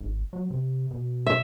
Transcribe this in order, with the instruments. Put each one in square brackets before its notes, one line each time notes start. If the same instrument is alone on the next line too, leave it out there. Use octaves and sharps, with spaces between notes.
[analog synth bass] G#1
F#3
C3
B2
[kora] E5